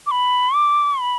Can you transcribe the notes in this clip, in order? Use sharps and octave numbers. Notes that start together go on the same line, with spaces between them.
D6
B5
D6
B5